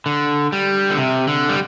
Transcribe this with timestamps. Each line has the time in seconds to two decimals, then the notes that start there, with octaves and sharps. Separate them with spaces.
0.06 D3
0.52 G3
0.90 D3
0.97 C3
1.27 D3
1.49 G3